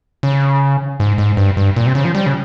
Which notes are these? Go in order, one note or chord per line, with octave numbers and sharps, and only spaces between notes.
C#3
G#2
G#2
G2
G2
A#2
C3
C#3
F3
G3
C#3